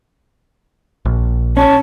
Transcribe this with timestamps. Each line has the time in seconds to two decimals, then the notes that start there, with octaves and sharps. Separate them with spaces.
1.05 A#1
1.57 C#4 A5